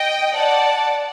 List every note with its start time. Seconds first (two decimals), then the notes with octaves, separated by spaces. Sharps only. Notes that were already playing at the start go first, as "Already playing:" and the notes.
Already playing: D#5 G5
0.34 D5 F#5 A5